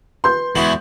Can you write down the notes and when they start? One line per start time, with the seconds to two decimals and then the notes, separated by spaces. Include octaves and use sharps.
0.24 B4 C6 G6
0.55 E2 G#3 E4 F#4